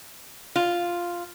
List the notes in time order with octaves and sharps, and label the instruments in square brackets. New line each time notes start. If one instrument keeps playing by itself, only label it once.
[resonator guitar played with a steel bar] F4